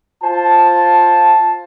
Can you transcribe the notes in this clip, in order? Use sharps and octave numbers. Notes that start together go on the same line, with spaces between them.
F4 C5 A5